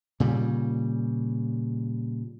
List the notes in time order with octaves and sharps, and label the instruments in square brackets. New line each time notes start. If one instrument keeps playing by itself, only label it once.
[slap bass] A#2 C#3 G3